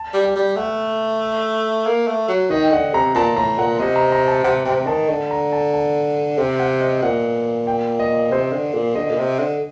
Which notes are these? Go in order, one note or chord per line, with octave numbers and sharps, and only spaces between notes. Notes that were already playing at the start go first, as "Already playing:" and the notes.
Already playing: A5
G3
G5
G3
A3 F#5
A#3
A3
F#3
D#3 D#5
G5
D3 F#5
C3 A#5
A#2 A5
A2 A#5
A#2 F#5
C3 D#5
A#5
A#5
A5
C3 F#5
C3 G5
D#3 A5
D3 A5
A#5
A5
A5
C3 G5
F#5
D#5
A#2 F#5
G5
D#5
C3 C5
D3
A#2
D3 D#5
A#2
C3
D3